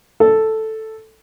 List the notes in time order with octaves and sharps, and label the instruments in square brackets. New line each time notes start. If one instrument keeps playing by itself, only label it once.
[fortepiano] A4